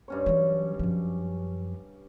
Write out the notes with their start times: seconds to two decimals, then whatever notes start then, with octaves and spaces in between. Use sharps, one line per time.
0.08 G2 C#4 C#5
0.26 E3 F#3
0.79 F#2 F3